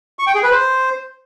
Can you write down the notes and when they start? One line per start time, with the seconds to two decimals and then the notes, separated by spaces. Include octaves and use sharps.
0.19 C#6
0.27 G5
0.35 G#4
0.43 B4
0.51 C5